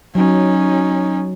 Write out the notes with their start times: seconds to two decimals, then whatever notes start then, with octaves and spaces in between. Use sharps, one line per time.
0.15 F#3 C#4 D#4